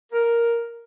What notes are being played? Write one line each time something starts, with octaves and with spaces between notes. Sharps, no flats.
A#4